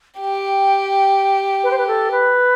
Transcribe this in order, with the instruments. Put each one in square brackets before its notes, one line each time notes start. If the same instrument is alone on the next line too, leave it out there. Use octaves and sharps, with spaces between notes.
[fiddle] G4 [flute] G5
[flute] B4
C5
B4
A4
B4